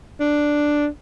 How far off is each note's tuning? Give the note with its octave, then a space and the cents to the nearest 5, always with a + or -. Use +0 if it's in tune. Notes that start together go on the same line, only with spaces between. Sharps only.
D4 +0